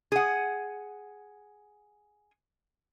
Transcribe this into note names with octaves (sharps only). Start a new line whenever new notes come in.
G#4 F#5